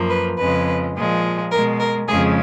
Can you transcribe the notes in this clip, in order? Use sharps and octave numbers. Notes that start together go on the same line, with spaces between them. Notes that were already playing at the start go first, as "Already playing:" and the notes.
Already playing: F#2 F3 A#3
B4
F2 C#3 G#3 B4
A#2 F3 G#3
B2 G#3 A#4
A#4
F2 C#3 G#3 G#4